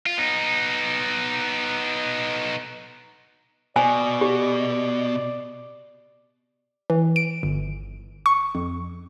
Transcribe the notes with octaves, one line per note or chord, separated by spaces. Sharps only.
F4
B3 D#4
B2 D5 G#5
G4 D5
E3
D7
G1
C#6
F2